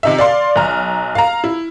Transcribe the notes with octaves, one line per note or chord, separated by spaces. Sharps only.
C3 D#4 E5
D5 F5 C6
B1 A#5 F6
F5 A#5
E4